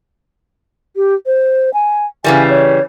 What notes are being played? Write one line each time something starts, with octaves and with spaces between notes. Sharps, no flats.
G4
C5
G#5
C#3 E3 G3 G#5
C#5